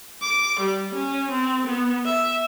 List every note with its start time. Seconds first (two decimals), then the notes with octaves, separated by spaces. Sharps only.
0.22 D6
0.60 G3
0.94 C#4
1.31 C4
1.67 B3
2.06 E5